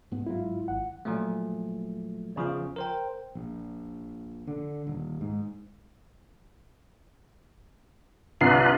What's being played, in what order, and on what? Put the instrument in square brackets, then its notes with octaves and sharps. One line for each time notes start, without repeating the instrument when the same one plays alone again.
[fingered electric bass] G#2 B3
[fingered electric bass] G1 G#2 F#3 [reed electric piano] E4 F4
[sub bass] G#1 [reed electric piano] F#5
[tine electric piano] A#2 F3 F#3 A3
E2 C#3 F3 F4
A#4 C5 G5
[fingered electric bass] A#1
D3
D#1
G#2
[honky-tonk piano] C2 C7 [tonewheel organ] D4 F4 B4